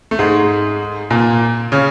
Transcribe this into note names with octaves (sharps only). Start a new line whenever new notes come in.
A3
G#2 G#3
A#2 A#3
C#3 C#4